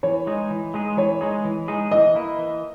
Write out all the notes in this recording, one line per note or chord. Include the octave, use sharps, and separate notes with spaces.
E3 C#5
G#3 D#4 G#4
E3
G#3 D#4 G#4
E3 C#5
G#3 D#4 G#4
E3
G#3 D#4 G#4
E3 D#5
A#3 E4
E3